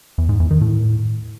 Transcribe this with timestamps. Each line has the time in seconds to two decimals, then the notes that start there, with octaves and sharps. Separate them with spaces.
0.18 E2
0.29 G#2
0.40 E2
0.51 D#3
0.61 A2